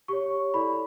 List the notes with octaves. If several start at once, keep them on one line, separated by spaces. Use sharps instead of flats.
G4 C#5 C#6
E4 A4 D5 B5